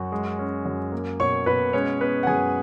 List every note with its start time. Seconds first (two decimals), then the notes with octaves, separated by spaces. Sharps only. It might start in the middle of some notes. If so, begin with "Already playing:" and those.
Already playing: F#2 F#4
0.12 G#3
0.39 C#4
0.65 F#2
0.92 A#3
1.20 B2 C#5 C#6
1.46 B2 B4 B5
1.73 G#3 C#4 C#5
2.00 B3 B4
2.23 F#5
2.27 F#2 G#4 G#5